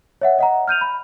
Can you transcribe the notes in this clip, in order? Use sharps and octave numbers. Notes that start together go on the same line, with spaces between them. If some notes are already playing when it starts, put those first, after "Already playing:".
C#5 E5 F#5
D#5 F#5 A#5
F6 G6 D#7 F7
B5